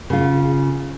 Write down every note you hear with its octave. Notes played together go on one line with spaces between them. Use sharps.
C#3 F4